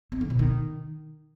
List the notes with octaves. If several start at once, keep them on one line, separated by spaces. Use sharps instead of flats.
C4
D3
B2
D#3